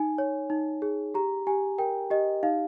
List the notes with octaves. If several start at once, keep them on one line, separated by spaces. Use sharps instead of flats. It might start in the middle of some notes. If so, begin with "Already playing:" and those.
Already playing: D#4 G#5
C#5
D#4
G#4
G4 A#5
G4 G#5
A#4 G5
G4 D#5
D#4 F5